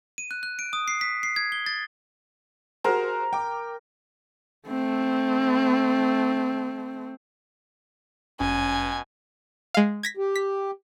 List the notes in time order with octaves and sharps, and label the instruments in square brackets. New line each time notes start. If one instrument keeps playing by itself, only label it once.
[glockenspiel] D#7
F#6
F#6
D7
D#6
C7
B6
C7
G#6
G7
A6
[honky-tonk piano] F#4 G#4 C5 [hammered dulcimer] A#4
[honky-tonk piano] G5 D6
[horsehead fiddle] A3 C4
[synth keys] G1 F#2 C#4 [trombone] B2 [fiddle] G#5
[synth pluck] G#3 F5
G#6 A#6 B6
[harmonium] G4
[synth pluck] B6